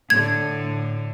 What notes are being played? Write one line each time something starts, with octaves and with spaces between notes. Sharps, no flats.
A2 D3 G#6